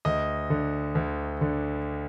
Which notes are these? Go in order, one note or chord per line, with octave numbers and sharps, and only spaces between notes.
D2 D#5
D3
D2
D3